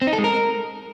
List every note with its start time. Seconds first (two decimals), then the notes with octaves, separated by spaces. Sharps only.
0.02 C4
0.07 D#4
0.13 A4
0.18 G#3
0.24 A#4